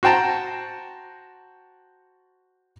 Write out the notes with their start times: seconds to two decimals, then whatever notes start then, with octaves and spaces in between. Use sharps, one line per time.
0.03 F#4 C5 G5 A5 A#5